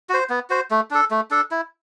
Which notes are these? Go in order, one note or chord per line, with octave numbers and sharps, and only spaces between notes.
F#4 C5
B3
F#4 C5
A3
D4 A4
A3
D4 A4
E4